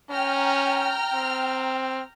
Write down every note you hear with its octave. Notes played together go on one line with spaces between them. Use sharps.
C#4 G5 A#5 F6
C4